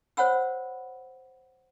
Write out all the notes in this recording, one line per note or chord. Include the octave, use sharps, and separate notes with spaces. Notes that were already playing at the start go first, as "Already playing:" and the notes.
C5 C#5 F#5 B5 E6